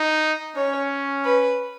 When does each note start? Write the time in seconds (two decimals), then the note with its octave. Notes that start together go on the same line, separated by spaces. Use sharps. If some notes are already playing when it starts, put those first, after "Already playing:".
Already playing: D#4
0.56 C#4 C#5
1.25 B4